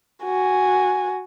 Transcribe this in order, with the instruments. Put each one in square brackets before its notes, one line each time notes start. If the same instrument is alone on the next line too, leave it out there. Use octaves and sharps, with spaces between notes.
[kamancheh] F#4 G#5